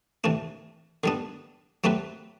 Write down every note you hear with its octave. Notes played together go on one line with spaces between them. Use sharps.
C3 E3 A3 D4
D3 G3 B3 D4
F#3 A3 C4 G4 B4